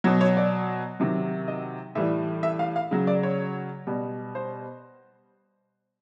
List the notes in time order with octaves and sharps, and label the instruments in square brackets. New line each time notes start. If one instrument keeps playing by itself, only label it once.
[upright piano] B2 F#3 C#5
C#5
D5
C3 D#3 F#3
D#5
A2 E3 G3 E5
E5
F5
F5
C#3 F#3
D5
C#5
B2 G3
C5